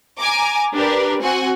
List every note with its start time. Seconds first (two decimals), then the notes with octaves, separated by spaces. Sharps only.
0.18 G#5 A#5 D6
0.73 D4 G4 A#4 B4
1.22 C4 F#4 F#5 G#5